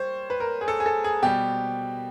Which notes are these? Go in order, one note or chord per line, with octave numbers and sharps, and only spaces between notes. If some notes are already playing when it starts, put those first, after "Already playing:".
Already playing: G3 C5 C#5
B4
A#4
G#4
A4
G#4
A4
G#4
B2 G3 G4